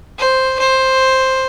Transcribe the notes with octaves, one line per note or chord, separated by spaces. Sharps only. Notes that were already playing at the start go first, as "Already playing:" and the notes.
C5
C5